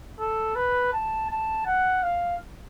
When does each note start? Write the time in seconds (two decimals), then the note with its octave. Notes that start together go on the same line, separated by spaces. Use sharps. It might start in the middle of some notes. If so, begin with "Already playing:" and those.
0.20 A4
0.56 B4
0.93 A5
1.30 A5
1.66 F#5
2.03 F5